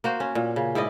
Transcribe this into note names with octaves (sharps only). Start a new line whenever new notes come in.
A#3 F#4 C5
C#4
A#2
C#3
G#2 E4 D5 D#5